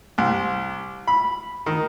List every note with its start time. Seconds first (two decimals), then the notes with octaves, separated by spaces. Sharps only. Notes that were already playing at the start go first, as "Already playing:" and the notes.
0.18 C2
1.08 B5
1.66 D#3